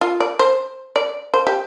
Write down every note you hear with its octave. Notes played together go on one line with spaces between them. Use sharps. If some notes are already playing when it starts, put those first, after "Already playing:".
F4
D5
C5
D5
C5
G4